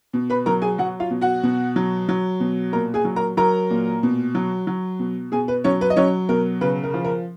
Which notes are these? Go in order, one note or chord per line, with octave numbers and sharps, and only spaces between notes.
B2
B4 B5
F#3 A#4 A#5
G#4 G#5
F#3 F#4 F#5
F4 F5
B2
F#4 F#5
B2
F#3
F#3
B2
A#2 A#4 A#5
G#4 G#5
F#3
A#4 A#5
F#3 A#4 A#5
A#2
B2
F#3
F#3
B2
B2 G#4 G#5
B4
F#3 C#4 C#5
B4
D#5
F#3 C#4 C#5
B2 A#4
C#3 B4
A#4
F3
A#4